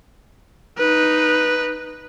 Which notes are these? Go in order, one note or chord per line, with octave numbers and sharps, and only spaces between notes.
D#4 B4